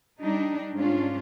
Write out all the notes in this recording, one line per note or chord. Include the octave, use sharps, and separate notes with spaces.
G3 D4 D#4
G#2 C#4 D4 F4